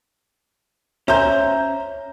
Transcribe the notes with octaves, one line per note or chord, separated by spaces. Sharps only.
C#4 C5 E5 A#5 G6